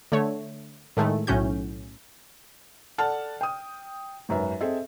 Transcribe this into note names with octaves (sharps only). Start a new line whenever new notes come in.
D3 A3 C#5
A2 D#3 G#3 A3
B1 A2 C#4 F#4 G6
A4 D5 F#5 A5 F6
G5 D#6
G#1 F#2 B4 E5
C4 G#4 A4 D#5 E5